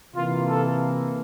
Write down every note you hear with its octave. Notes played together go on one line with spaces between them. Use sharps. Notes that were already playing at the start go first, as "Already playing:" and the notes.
C3 E3 A#3 F4
A4